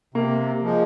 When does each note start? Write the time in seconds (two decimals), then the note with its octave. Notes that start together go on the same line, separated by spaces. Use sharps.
0.14 C3 A#3
0.62 F3 G#3